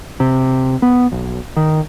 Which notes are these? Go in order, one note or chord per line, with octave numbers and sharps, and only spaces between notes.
C3
B3
B1
D#3